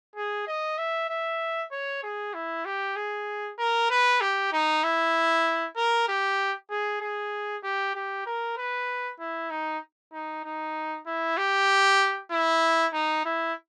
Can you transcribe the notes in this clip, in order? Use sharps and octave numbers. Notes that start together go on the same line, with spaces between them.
G#4
D#5
E5
E5
C#5
G#4
E4
G4
G#4
A#4
B4
G4
D#4
E4
A#4
G4
G#4
G#4
G4
G4
A#4
B4
E4
D#4
D#4
D#4
E4
G4
E4
D#4
E4